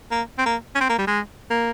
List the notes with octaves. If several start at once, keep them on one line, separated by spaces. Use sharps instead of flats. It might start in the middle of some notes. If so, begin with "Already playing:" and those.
A#3
C4
A#3
C#4
C4
A#3
G3
G#3
A#3